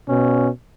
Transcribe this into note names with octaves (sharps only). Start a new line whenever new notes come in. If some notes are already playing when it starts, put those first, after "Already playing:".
B2 C#4